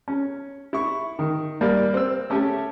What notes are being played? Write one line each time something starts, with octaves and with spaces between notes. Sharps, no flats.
C#4
E4 C#6
D#3
G3 A#3 D5
C4 E6
A3 C#4 G4 E5